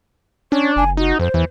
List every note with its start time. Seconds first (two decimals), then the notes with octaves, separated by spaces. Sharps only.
0.52 C#4 D4 C#5
0.76 F#1 G#5
0.97 D#4 F#4
1.20 F2 C5
1.34 E2 E3